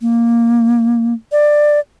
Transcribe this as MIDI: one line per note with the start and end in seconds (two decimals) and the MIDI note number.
0.01 1.13 58
1.32 1.80 74